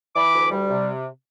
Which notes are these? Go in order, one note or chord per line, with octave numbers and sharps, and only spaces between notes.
E3 B5 D6
D2
G3
C3